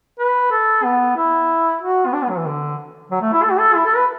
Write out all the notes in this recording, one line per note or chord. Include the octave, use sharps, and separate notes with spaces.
B4
A4
B3
E4
F#4
B3
D4
B3
F#3
E3
D3
F#3
A3
E4
A4
F#4
A4
E4
A4
B4